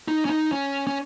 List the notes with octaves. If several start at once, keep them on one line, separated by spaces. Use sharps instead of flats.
D#4
C#4
D#4
C#4
C#4